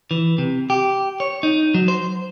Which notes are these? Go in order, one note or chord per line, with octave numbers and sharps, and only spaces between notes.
E3
C3
G4
C#5
D#4
F#3
C5